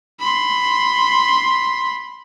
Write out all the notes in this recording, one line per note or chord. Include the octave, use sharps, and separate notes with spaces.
B5 C6